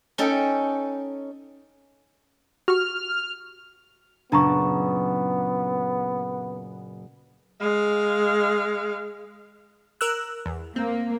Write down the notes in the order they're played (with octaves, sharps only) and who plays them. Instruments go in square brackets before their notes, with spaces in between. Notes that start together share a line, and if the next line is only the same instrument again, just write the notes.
[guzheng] C#4 D#4 A4 G5
[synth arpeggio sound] F#4 G4 C#6 [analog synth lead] F6
[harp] F#1 A#2 A5 [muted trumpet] B3 [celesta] D4 A#5 C#6
[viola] G#3 F5
[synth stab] A#4 E6 F#6
E2
[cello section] A#3 [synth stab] C4